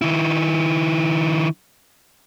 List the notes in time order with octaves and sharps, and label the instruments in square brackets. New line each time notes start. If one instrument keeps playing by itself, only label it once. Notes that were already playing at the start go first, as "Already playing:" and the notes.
[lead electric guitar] D#3 E4